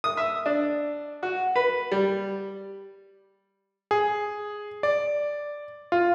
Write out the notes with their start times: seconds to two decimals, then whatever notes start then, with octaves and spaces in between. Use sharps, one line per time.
0.04 D#6
0.17 E5
0.46 D4
1.23 F#4
1.56 B4
1.92 G3
3.91 G#4
4.83 D5
5.92 F4